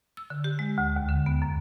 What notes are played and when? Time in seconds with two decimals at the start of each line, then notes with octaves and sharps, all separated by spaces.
0.17 E6
0.30 D3
0.44 G4
0.59 G#3
0.78 D2
0.96 D#2
1.09 D3
1.26 B3
1.42 F#2